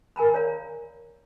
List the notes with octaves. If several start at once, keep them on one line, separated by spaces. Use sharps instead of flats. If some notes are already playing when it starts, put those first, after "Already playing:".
A#4 G#5 A#5 B5
C#5 D5 F5 A#5